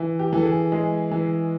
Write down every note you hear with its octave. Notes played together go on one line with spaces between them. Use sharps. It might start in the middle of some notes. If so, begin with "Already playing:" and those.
Already playing: E3
G4
E3 A4
G#4
G#3 G#4
E3